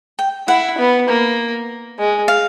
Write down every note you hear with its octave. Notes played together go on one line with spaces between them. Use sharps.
G5
E4 F#5
B3
A#3
G#3
F5